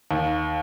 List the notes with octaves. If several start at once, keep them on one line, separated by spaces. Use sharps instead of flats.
D#2